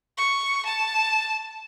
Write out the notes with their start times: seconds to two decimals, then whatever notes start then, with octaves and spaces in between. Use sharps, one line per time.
0.18 C#6
0.65 A5